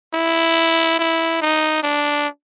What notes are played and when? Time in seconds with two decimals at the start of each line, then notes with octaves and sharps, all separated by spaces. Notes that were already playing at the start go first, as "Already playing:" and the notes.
0.14 E4
0.99 E4
1.42 D#4
1.83 D4